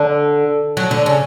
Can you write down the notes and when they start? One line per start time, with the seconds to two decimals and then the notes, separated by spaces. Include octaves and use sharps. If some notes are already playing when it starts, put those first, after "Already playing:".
Already playing: D3
0.77 F#3
0.91 D3
1.06 C#3